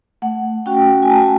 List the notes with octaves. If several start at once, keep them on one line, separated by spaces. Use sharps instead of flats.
A3 F#5
C#4 F#4 G5
G#5
A3 A5